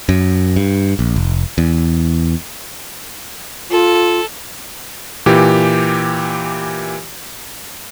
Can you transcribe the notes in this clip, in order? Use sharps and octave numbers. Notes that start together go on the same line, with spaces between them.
F#2
G2
A#1
F1
E2
F4 A4
A#2 E3 G4